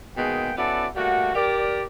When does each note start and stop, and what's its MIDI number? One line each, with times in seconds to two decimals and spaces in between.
0.17 0.52 47
0.17 0.52 51
0.17 0.52 56
0.17 0.52 58
0.17 0.52 68
0.17 0.52 79
0.57 0.88 59
0.57 0.88 61
0.57 0.88 64
0.57 0.88 66
0.57 0.88 69
0.57 0.88 74
0.96 1.35 55
0.96 1.35 57
0.96 1.35 58
0.96 1.35 66
1.35 1.85 67
1.35 1.85 70
1.35 1.85 74